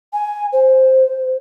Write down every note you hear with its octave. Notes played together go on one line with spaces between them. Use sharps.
G#5
C5